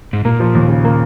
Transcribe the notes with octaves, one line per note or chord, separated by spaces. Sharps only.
G#2
A#2 A#3
F3
D#2
C#3
A#3